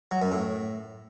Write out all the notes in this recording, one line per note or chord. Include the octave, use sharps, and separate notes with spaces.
F#3
F#2
A2